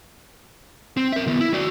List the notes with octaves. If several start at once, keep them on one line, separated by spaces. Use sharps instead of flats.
C4
A#4 E5
D#3 B3
E4
F#4 D5